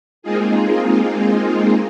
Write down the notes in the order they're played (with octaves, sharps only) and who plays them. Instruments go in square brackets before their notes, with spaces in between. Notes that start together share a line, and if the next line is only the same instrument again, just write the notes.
[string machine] G#3 A#3 C4 D#4 F4 G#4